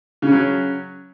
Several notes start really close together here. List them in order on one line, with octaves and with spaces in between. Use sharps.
C#3 C#4 F#3